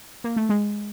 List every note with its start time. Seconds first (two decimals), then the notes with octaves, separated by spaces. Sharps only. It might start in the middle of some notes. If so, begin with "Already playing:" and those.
0.24 A#3
0.36 A3
0.49 G#3